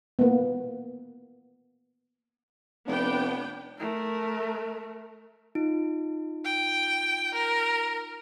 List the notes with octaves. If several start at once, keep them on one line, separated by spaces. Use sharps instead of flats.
A#3 B3
F1 B3 D4 G5
A3 A#4
D#4 F4 D7
G5
A#4